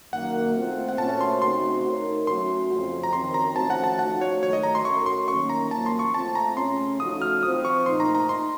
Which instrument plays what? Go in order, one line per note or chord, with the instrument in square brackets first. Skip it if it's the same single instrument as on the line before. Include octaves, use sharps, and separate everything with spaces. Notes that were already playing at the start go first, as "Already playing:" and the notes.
[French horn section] F#2 D#3 A#3 [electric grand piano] F#5
[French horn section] A3 C4 F4 C5
[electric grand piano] F#5
[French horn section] A#2 A3 C#4 F#4 C5 [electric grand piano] A5
[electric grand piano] C6
[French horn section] C#3 A3 C4 D#4 F#4 [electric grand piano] C6
[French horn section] A3 D#4 A#4 C#5
[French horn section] F#3 A3 C#4 F#4 [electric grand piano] C6
[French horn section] F2 C#3 F3 C4 F4
[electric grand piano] A#5
[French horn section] F#2 D#3 F#3 C4 [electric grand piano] C6
[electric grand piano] A#5
[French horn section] F3 A3 C#4 F#4 C5 [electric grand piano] A5
[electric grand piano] F#5
A5
[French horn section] F3 A3 D#4 F#4 [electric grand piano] F#5
[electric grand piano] C#5
[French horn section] D#3 F#3 A3 [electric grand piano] C#5
[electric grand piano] D#5
A#5
C6
[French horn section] A3 C#4 F#4 A#4 C#5 [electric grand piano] C#6
[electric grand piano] C6
[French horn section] F#2 D#3 A#3 C#4 [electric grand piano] C#6
[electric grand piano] A#5
[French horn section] F#2 F3 A#3 [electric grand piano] A5
[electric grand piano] C6
C#6
[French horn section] A3 C4 F4 [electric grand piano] A5
[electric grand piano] A#5
[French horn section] C#3 A3 C#4 [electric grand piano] C6
[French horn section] F3 A3 D#4 F#4 A4 [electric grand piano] D#6
[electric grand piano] F6
[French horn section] F3 C4 F4 C5 [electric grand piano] D#6
[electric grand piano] C#6
[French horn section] A#2 A3 D#4 [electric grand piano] C6
[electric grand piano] A#5
A#5
C6